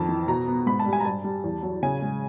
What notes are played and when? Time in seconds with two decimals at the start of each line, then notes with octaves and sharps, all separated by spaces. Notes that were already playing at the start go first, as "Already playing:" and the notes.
Already playing: F2 D#3 A5
0.09 E3
0.28 B2 A#5
0.48 B3
0.66 G#2 B5
0.79 A5
0.86 G3
0.93 G#5
1.00 A#5
1.05 G2 A5
1.24 G3
1.44 E2
1.63 F#3
1.83 C#3 G#5
2.02 G#3